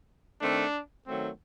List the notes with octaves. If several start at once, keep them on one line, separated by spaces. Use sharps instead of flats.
D#3 A3 C4 D4
D#3 F#3 A3 C4